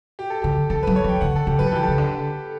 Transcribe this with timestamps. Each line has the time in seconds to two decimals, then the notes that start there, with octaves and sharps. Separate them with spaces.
0.19 G4
0.30 A4
0.42 D3 G4
0.70 E3 A4
0.83 F#3 B4
0.96 C#5
1.04 E3
1.08 G5
1.21 D3 F#5
1.36 A4
1.47 C#3 G4
1.59 F#3 B4
1.67 A4
1.72 E3
1.75 G4
1.83 A4
1.88 C#3
1.98 D3